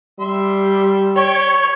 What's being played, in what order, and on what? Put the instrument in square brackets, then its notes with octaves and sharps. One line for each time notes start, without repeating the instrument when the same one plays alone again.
[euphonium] G3 [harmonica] E5 C6
[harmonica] G4 G5 C#6 [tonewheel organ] C#5